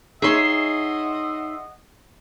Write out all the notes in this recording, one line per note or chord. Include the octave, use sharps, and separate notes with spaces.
D#4 G#4 C#5 D#5 E5 F#5 C6